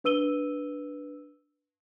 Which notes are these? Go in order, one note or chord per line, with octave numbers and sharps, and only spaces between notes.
D4 B4 E6 D#7 G7